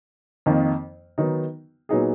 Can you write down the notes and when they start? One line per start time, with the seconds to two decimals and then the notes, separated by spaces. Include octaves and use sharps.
0.46 F2 D#3 A#3 D#4
1.18 D#3 F#3 B3 D#4
1.89 A#2 F#3 B3 D#4 G#4